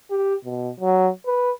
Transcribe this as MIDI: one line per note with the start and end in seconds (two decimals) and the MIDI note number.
0.11 0.35 67
0.45 0.70 47
0.80 1.09 54
1.27 1.52 71